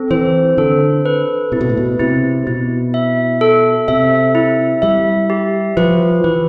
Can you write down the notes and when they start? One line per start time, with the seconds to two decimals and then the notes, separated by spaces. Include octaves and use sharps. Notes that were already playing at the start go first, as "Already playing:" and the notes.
Already playing: C4 A4
0.10 E3 C5
0.58 D3 A4
1.06 B4
1.52 C3 E4
1.61 B2
1.69 A2
1.77 B2
1.99 C3 E4
2.47 B2 E4
2.94 E5
3.41 A4
3.88 C3 E5
4.35 E4
4.82 G3 E5
5.30 G4
5.77 F3 B4
6.24 E3 B4